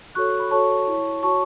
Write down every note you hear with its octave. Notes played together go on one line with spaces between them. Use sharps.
F#4 A4 C#5 C#6 F#6
B5
F#4 A4 C#5 A5 C#6
E4 C#5
F#4 C#5 A5 C#6